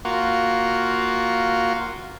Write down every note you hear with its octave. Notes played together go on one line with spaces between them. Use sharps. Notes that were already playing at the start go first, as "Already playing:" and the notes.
A#3 F4 F#4